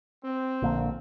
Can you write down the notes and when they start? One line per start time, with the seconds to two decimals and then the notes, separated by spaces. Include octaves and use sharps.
0.24 C4
0.62 A#1 D3 A#3